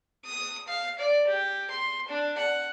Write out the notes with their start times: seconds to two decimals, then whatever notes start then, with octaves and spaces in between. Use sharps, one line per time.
0.25 D#6
0.68 F5
0.99 D5
1.27 G4
1.71 C6
2.09 D4
2.38 F#5